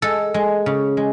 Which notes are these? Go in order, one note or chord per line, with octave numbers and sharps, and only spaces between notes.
G#3 A4
G#3
C#3
G#3